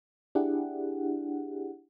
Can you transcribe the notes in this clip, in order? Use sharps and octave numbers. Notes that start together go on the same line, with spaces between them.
D4 E4 G4 G#4 F#5